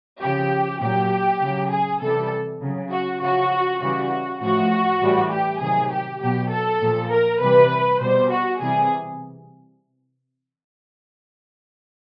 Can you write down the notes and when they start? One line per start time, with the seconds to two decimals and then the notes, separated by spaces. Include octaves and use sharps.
0.21 C#3 F3 G4
0.81 A#2 F#3 G4
1.41 C#3 F#3
1.71 G#4
2.01 C3 E3 G3 A4
2.62 C#3 F#3
2.91 F#4
3.21 C#3 F3 F#4
3.80 C#3 E3 G3 F#4
4.41 A2 F3 F#4
5.01 A2 E3 G3
5.31 G4
5.60 C3 D#3 F#3 G#4
5.91 G4
6.20 B2 F#3 G4
6.51 A4
6.81 A#2 F3
7.11 A#4
7.41 C3 E3 G3 B4
8.01 B2 G3 C5
8.31 F#4
8.60 C3 E3 G3 G#4